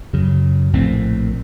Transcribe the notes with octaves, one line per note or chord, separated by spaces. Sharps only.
F#2 C#3 F#3
A#1 A2 A3 C4